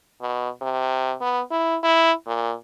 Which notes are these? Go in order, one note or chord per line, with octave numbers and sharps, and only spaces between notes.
B2
C3
B3
E4
E4
A#2